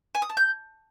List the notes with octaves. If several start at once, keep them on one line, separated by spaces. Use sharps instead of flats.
G#5
D#6
A5
G6